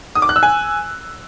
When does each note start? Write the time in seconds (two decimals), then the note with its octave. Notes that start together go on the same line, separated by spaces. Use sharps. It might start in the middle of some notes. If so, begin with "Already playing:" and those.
0.15 D#6
0.22 D6
0.29 F#6
0.36 E6
0.43 G#5